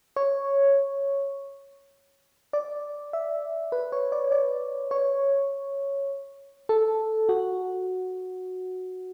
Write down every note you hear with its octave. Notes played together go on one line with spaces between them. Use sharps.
C#5
D5
E5
B4
C#5
D5
D5
C#5
A4
F#4